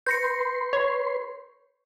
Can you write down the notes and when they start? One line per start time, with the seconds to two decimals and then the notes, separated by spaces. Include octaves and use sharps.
0.06 B4 C6 G6 A#6 C#7
0.73 C#5